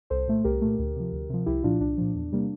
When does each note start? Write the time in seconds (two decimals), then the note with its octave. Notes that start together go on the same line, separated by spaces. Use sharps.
0.10 C2 A4 C5
0.28 A#2 A3
0.44 C2 G4 A#4
0.61 A#2 A3
0.79 D2
0.96 C3 F3
1.12 D2
1.30 C3 F3
1.46 C2 E4 G4
1.64 A#2 F3 D4 F4
1.80 C2 D4
1.98 A#2 F3
2.15 E2
2.32 C3 G3 A#3